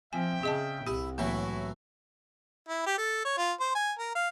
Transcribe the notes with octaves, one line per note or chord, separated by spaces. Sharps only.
F3 C4 E5 G5 G#5
C#3 G#4 D#5 A5
C2 E4 G4
A2 E3 F#3 A#3 E4 F#4
E4
G4
A4
C#5
F4
C5
G#5
A#4
F5